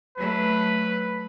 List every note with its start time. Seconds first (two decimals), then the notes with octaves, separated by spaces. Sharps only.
0.18 F#3 A3 B4